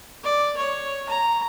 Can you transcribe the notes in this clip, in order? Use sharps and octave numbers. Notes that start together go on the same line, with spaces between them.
D5
C#5
A#5